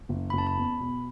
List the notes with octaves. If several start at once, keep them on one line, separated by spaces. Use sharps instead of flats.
F#1
F#1 B5
A5
B5
E2
B2